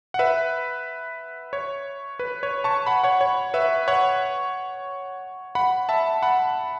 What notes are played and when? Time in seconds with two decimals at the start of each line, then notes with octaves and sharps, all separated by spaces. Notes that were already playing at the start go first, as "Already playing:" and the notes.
0.14 F#5
0.19 B4 E5
1.53 C#5
2.19 B4
2.43 C#5
2.64 A5 C#6
2.86 F#5 B5
3.03 C#5 F#5
3.21 C#5
3.54 B4 E5
3.88 C#5 F#5
5.55 F#5 B5
5.89 E5 A5
6.23 F#5 B5